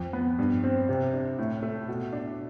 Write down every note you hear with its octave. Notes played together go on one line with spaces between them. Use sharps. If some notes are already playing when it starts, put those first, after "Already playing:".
Already playing: F2
B3
G2
C4
C3
D4
A2
A3
B2
D4